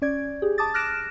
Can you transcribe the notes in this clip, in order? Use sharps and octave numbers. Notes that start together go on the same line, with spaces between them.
C#4 D5 G#6
G4 G#4
A5 D6 D#6 A6
F6 F#6 A#6 D7 E7